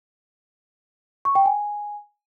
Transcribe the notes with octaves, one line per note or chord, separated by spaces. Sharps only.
C#6
G5
G#5